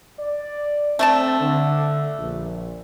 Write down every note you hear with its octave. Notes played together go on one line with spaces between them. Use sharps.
D5
A3 C4 D5 A5
D3
A#1